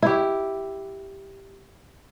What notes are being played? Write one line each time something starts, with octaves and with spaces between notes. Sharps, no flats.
E4 G4